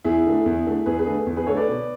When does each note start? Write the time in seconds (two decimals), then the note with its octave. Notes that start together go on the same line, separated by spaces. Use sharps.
0.04 E2 E4 G#4
0.26 D3 A3
0.46 E2
0.66 D3 A3
0.86 E2 G#4 B4
0.99 G#4 B4
1.06 D3 A3
1.26 E2
1.36 G#4 B4
1.46 D3 A3 A4 C#5
1.57 B4 D5
1.67 B2